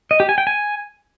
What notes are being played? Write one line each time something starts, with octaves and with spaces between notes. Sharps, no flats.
D#5
G4
G#5
G5
G#5